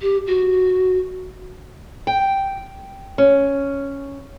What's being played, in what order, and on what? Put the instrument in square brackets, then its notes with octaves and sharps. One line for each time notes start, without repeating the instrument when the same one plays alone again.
[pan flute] G4
F#4
[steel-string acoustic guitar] G5
C#4